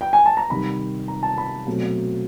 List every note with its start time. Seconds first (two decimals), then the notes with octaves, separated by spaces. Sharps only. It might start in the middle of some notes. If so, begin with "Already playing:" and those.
0.01 G5
0.13 G#5
0.26 A5
0.37 A#5
0.50 C3 D#3 G3 B5
1.08 A#5
1.23 A5
1.38 B5
1.66 B2 F#3 A3 C4